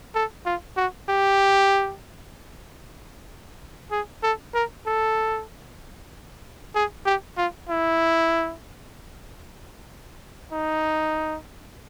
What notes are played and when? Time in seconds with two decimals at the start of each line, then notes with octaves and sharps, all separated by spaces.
0.15 A4
0.46 F4
0.77 F#4
1.09 G4
3.91 G#4
4.23 A4
4.55 A#4
4.86 A4
6.75 G#4
7.06 G4
7.37 F4
7.69 E4
10.52 D#4